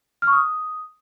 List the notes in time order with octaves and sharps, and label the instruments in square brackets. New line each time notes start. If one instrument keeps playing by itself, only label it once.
[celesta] F6
C#6
D#6